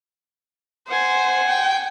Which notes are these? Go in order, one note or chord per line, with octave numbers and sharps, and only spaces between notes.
C5 F#5 G#5
G5